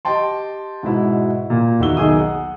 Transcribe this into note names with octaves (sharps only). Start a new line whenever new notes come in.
G4 D#5 G5 A5 C6
G#2 B2 E4
A#2
E2 D#3 F#4 E5 E6 G7
B1 D#3 G#4 D#6
F#5